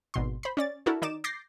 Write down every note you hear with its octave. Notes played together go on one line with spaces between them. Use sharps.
G#1 B2 C6
C5 B5
C#4 D5 A6
D4 E4 F#4 A4 A#4
D#3 D#4 D5 D6 E7
D6 G6 A6 A#6 C7